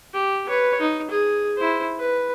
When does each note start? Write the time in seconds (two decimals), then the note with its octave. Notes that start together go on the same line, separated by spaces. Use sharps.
0.13 G4
0.48 B4 C#5
0.81 D#4
1.10 G#4
1.58 E4 C5
1.99 B4